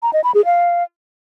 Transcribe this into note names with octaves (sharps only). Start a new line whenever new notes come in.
A#5
D#5
B5
G#4
F5